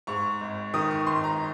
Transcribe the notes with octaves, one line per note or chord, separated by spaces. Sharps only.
G#2 C#6
G#1
D#3 D#6
C#6
G#1 C6
A#5